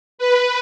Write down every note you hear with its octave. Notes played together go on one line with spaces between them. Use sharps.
B4